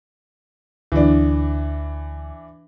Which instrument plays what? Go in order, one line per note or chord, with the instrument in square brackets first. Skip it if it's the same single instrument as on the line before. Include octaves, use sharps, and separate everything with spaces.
[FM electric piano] D2 [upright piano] E3 D4